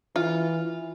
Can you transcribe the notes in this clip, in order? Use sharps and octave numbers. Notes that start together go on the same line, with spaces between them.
E3 F4